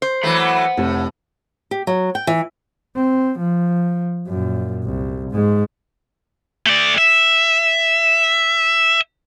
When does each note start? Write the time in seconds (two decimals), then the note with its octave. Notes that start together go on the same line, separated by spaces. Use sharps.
0.02 C5
0.23 E3 F#3 A3 F#5 B5
0.77 F1 A2
1.71 G4
1.87 F#3
2.15 G5
2.27 E3
2.96 C4
3.40 F3
4.27 F#2 A#2
4.84 C2
5.32 G#2 G#3
6.66 A3 D5
6.98 E5